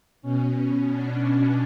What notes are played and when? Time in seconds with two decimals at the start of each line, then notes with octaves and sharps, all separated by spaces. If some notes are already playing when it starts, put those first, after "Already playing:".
0.22 B2 C#4
0.90 D4